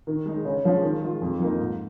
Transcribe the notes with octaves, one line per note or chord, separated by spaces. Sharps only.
D#3
G#3 D#4
C#3
F3 G#3 C#4
D#3
G#3 F4
F2
F3 A#3 D#4
G#2